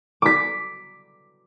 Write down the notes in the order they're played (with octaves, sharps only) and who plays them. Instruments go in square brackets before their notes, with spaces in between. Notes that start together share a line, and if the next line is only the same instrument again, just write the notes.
[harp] D6 B6